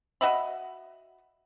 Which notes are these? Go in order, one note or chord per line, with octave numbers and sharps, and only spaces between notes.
F#4 D#5 E5 B5